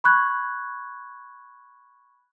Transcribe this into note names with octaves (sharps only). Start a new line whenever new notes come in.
B5 C#6 F#6 G#6